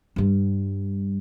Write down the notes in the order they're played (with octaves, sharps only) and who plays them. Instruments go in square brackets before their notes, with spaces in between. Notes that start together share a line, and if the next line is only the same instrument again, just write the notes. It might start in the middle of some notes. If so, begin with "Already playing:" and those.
[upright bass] G2 G3